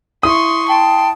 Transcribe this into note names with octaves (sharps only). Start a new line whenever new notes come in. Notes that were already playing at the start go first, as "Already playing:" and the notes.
E4 C6 C#6 D#6
G5 A5 C6